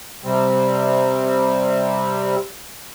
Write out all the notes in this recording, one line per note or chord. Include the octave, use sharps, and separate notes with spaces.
C3 G3 C4